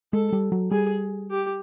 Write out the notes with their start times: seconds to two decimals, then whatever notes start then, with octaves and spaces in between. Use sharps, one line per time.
0.13 G#3 A4
0.33 G3
0.52 F#3
0.71 G3 G#4
1.31 G4